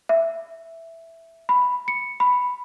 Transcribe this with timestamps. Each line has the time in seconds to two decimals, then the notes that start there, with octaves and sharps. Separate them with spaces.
0.09 E5
1.49 B5
1.88 C#7
2.20 B5